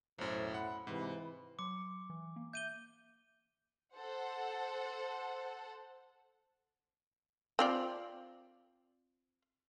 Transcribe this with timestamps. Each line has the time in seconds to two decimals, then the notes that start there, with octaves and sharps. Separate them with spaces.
0.19 B1 F#2 A2 C5
0.54 F#5 B5
0.87 G#2 C3 E3
1.59 F#3 C6 D6 C#7
2.10 E3
2.36 A#3
2.53 E5 G6 D#7 G7
3.94 A4 C5 F#5
7.59 C4 F4 D5